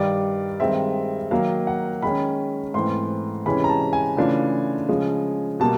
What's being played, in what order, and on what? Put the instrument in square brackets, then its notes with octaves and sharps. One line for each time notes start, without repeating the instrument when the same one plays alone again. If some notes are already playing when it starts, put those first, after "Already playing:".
Already playing: [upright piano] G2 D#3 G3 D5
G2 D#3 G#3 C4 E5
D#3 F#3 A#3 F5
F#5
D#3 G#3 C#4 B5
G#2 E3 A3 C4 C6
C3 E3 G#3 C#4 B5
A#5
A5
G#5
C#3 E3 A3 D4 F4
C#3 F3 G#3
B2 G3 A#3 A5